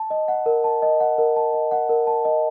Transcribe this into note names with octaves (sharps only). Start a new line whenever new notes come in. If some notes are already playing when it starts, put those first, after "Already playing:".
Already playing: A5
D#5
F#5
A#4
A5
D#5
F#5
A#4
A5
D#5
F#5
A#4
A5
D#5